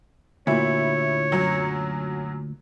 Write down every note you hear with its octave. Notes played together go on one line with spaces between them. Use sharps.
D2 A#2 E4 C#5
F#2 F#3